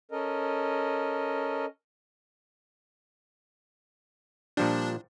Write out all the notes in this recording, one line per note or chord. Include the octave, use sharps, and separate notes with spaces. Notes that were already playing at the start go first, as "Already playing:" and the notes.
C#4 A4 A#4 D#5
A#2 F3 G3 D4